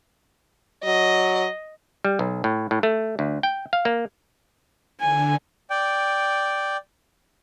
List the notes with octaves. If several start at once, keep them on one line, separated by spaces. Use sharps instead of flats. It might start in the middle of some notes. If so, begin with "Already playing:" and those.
F#3 D#5
G3
B1
A2
A2
A3
D2
G5
F5
A#3
D3 G#5
D5 G5